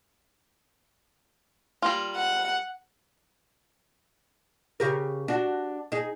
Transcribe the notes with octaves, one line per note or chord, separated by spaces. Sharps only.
G3 A#3 F4
F#5
C#3 G4 A#4
D4 F#4
D#4 G#4